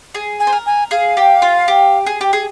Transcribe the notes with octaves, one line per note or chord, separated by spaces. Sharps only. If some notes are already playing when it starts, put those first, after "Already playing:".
G#4
G#5
C5
A#4
G#5
G#4 F5
G4
F4
G4
G#4
G4
G#4